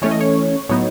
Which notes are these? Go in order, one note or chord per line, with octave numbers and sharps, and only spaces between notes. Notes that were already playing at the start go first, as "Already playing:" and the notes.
E3 A3 C#4 C#5
D#5
C#5
A2 F#3 B3 D#4 C#5